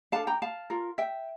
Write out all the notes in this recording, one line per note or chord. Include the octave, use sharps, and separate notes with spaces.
D4 A4 F5 A5
G5 A#5
F5 A5
F4 A#4
E5 G5